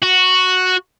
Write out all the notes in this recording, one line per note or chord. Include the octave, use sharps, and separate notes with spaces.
F#4